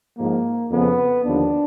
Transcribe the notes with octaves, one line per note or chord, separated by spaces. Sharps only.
G#2 F3 A#3
F2 C#3 F3 B3
D#2 D3 F3 D4